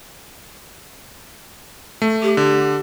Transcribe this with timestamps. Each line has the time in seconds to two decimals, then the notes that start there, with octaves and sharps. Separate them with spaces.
2.02 A3
2.23 G4
2.37 D3